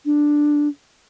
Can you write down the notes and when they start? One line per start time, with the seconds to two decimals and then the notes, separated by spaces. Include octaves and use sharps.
0.05 D4